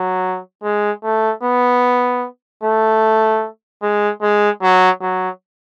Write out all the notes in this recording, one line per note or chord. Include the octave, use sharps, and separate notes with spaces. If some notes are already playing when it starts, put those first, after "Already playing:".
Already playing: F#3
G#3
A3
B3
A3
G#3
G#3
F#3
F#3